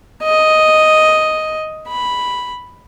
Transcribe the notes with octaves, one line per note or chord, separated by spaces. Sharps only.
D#5
B5